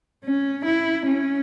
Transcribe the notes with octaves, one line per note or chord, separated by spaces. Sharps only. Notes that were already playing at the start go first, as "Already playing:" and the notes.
C#4
E4
C#4